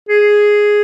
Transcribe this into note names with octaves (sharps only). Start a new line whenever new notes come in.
G#4